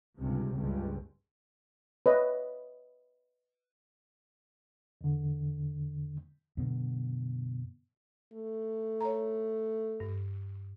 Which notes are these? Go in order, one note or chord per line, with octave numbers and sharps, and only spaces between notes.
C#2 G2 C3
F#1 C#2 G2
B4 C#5 D#5 E5
E2 D3
F#2 B2 D3
A3
C#5 A#5
G2